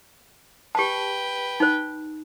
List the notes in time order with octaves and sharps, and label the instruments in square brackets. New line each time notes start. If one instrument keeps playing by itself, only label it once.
[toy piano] G4 A5 [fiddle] B4 G5
[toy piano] D#4 C5